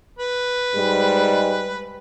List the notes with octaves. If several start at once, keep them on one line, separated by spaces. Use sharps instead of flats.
B4
G#2 G3 G#3